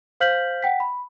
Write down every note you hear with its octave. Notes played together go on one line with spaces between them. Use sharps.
C5 F5 F6 G6 B6 F#7
F#5 G5 B6
B5